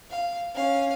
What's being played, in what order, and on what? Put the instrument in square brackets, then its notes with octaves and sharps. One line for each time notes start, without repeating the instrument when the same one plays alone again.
[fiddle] F5
C#4 F5